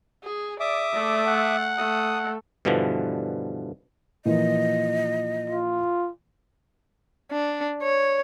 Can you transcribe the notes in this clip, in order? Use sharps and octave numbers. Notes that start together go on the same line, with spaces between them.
G#4
D5 E5 D6 D#6
A3 D5
F#5
A3 D#6
G2 B2 D3 E3 F3
A#2 E3 F3 D#5
F4
D4
C#5